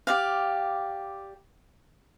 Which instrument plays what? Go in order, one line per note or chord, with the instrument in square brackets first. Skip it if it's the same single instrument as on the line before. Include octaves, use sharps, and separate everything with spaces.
[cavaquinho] G4 D5 F5